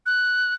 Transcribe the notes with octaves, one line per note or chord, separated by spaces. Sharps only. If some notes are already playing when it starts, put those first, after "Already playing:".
F#6